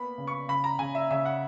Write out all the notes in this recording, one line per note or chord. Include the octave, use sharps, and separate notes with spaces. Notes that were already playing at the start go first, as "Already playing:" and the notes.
Already playing: A#3 B3 B5
C#3
C#6
C#3 B5
A#5
C#3 G#5
E5
C#3 E5
F#5